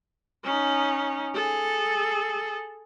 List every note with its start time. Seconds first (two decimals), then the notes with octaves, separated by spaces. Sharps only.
0.44 C#4 D#4
1.34 G#4 A4